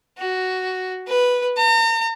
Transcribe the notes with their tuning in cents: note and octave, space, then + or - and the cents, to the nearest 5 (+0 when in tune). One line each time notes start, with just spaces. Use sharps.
F#4 +5
B4 -5
A#5 -40